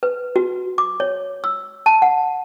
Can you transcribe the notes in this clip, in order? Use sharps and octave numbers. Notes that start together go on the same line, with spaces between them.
B4
F#4
D6
C#5
E6
A5
F#5